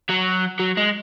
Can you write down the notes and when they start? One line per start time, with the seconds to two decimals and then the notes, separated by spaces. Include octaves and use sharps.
0.10 F#3
0.59 F#3
0.77 G#3